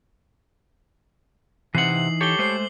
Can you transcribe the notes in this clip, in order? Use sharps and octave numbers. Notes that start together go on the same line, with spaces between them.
C3 E3 C4 D#4 F#5 C7 F#7
G4 A4 C#5 D6 G7
G#3 A3 C5 C7